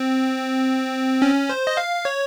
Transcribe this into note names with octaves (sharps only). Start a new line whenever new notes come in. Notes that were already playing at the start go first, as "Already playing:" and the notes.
Already playing: C4
C#4
C5
D#5
F5
C#5